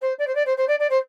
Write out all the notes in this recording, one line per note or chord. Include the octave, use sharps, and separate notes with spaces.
C5
D5
C5
D5
C5
C5
D5
D5
C5